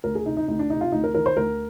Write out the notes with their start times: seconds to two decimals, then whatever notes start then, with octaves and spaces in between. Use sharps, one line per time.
0.04 D2 A#4
0.15 G#4
0.26 C3 D#4
0.37 D#4
0.48 D2 D#4
0.59 D4
0.70 C3 D#4
0.81 F4
0.92 D2 D#4
1.04 A#4
1.15 D#3 A#4
1.26 C5
1.36 D2 A#4